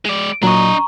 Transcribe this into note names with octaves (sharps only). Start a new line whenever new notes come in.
G#3 D5
A#2 F#3 D4 D#5 A#5 C#6